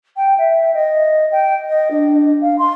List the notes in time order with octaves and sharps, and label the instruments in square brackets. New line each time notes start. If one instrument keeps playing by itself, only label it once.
[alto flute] G5
E5
D#5
G5
D#5
D4
F5
C6